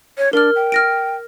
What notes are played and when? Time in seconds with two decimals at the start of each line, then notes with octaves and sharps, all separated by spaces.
0.18 C#5
0.33 D4 A#4 F6
0.56 G5
0.72 F6 A#6 D7